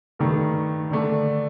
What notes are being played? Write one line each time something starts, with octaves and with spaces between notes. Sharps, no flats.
G2 D#3 A3
D3 A3 D4